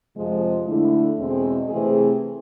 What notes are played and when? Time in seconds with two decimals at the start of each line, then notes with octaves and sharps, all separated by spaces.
0.16 F2 C3 F3 G#3
0.67 D3 A3 E4
1.18 E2 B2 G#3 C4
1.69 C3 E3 A3 C4 G#4